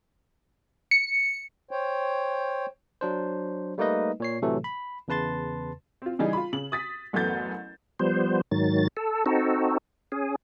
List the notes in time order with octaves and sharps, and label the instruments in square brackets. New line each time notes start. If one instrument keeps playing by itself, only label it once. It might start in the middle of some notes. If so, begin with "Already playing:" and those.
[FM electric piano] C#7
[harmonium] C5 C#5 G5
[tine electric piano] F#3 D4 C5
G3 A3 A#3 D#4 B4 D#5
A#2 C#5 C7
A2 C3 E3 F#3 A3 A4
B5
E2 C#3 B4 A5 C6 A6
[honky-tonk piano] C4 F4
C#3 E3 G3 D#4 G#4
F4 B5
C#3 F#7
D#6 A6 B6
A1 F#2 A3 B3 G6 A6
[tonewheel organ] F3 G3 B3 C5
G#2 D#3 F#3 A6
A4
C4 D#4 F#4 A4
C#4 G#4